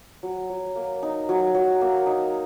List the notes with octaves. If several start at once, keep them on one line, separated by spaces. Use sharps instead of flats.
F#3
F#3
A#3
D#4
F#3
F#3
A#3
D#4